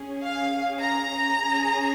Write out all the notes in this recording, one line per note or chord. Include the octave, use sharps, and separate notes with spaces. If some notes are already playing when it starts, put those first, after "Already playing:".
Already playing: C#4 G#4
F5
A#5
C#4 G#4